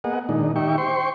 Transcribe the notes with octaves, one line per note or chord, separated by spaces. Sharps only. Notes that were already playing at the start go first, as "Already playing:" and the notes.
A#3 B3 G#4 D#5 F#5
A#2 D#3 G#3 D4 D#4
D#3 D#4 G4 E5 G5 C#6
C5 G5 C6 C#6